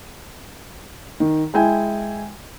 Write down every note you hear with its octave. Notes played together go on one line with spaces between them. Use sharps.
D#3
G#3 E4 G5 G#5